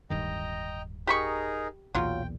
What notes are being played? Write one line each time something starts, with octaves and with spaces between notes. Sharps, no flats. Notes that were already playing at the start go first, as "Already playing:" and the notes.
D1 G2 D#3 D#5 G5 A#5
D#4 G4 G#4 A#4 B5 C#6
B1 E2 A#2 F#3 F4 G5